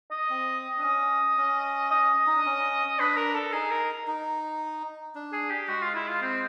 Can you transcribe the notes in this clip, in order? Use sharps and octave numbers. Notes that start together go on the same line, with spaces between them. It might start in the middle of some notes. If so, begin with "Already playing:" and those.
D#5
C4
D4
C#4 D#5
C#4
D#5
D#4
D4
C#4
D4 B4
A#4
A4
D#4 G#4
A#4
D#4
D4
G#4
G4
G#3 F#4
F4
E4
F4
C4